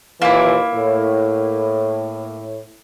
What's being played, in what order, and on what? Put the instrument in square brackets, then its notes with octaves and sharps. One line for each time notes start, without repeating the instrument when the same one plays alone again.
[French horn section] D#2 A#2 E3 [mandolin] A#3 E4
[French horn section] A2